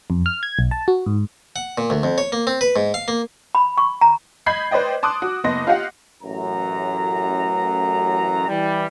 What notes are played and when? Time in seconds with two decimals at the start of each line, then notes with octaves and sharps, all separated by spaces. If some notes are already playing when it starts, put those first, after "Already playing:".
0.10 F2
0.26 F6
0.43 G#6
0.59 B1
0.71 A5
0.88 F#4
1.06 G#2
1.56 F#5
1.78 A#2
1.90 D2
2.03 F2
2.18 C#5
2.32 A#3
2.47 C4
2.61 B4
2.76 G#2
2.94 F5
3.08 A#3
3.55 B5
3.78 C#6
4.01 A#5
4.46 D#5 B5 G6 G#6 C7
4.71 B4 C5 D5 D#5 G5
5.03 A5 C6 D6 D#6 F#6
5.22 F#4
5.44 F#1 B3 D#5 C6 A#6
5.67 F4 G4 D#5 F5 F#5
6.23 A1 F#2 A#5
8.48 E3 G3